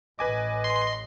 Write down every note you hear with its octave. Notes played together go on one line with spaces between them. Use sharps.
A1 A2 B4 D#5 G#5 D6
C6